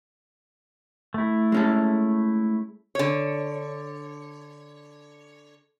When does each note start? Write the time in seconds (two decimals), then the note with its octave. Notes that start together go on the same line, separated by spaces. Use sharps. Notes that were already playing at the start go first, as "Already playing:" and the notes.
1.14 A3 E4
1.52 G#3 C#4 A4
2.95 D3 C#5